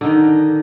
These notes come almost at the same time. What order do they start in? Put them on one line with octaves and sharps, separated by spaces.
D3 D#4 D#3